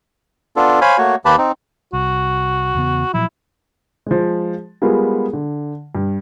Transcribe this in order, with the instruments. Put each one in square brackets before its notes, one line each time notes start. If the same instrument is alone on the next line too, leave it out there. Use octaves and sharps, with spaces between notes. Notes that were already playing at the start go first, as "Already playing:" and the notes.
[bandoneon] B3 D4 F4 A4
C5 C#5 F5 G#5 B5
A3 A#3 F#4 C#5
D#2 A#3 G4 B4 A5 B5
C4 D#4
[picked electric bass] C2 [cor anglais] F#4
[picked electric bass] E2 C#3 B3
[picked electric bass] A#2 F3 F#3 [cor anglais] E4
[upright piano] F3 G#3
G3 G#3 B3 F4 G#4 A#4
D3
G2